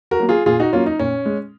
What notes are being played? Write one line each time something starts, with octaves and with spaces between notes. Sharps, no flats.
F#4 A#4
F#3 A#3
F4 G#4
A#2 F4 G#4
D#4 F#4
F#3 A#3 C#4 F4
D#4
A#2 C#4
G#3